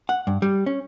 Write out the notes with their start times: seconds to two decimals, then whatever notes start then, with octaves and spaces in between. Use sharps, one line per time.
0.09 F#5
0.27 G2
0.42 G3
0.66 C#4